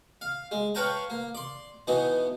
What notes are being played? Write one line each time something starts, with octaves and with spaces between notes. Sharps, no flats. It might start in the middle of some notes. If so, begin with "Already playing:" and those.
F5
G#3
B4 C#5 F5 G5 A5 A#5
A#3
D5 C6
B2 E3 B3 D#4